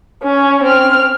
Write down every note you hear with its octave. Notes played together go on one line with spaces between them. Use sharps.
C#4
C4 F6